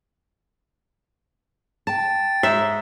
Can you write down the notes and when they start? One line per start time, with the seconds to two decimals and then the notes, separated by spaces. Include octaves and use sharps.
1.87 G5 A5 A6
2.43 G#2 E5